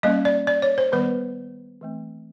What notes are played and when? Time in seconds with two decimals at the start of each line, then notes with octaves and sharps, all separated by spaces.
0.03 G3 A#3 C#4 D#5
0.25 D5
0.47 D5
0.62 C#5
0.78 C5
0.92 D#3 G3 B3 B4
1.81 E3 A3 C4